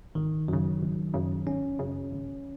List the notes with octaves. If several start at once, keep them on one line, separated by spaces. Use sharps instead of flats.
G#1 D#3
F#2 C#3 F#3
G#1
F#2 C#3
G#1 C#4
F#2 C#3
G#1